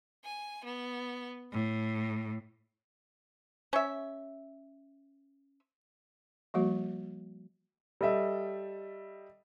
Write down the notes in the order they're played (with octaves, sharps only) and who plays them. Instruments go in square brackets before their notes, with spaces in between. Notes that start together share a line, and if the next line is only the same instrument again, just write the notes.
[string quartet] G#5
B3
A2
[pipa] C#4 E5
[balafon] F3 G3 A#3 F#4
[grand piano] G3 A4 D#5 E5